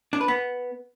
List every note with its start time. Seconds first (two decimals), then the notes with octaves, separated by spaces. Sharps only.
0.13 D4
0.21 B4
0.28 B3